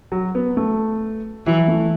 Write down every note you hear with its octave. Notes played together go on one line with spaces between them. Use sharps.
F#3
B3
A3
E3 F#3
A3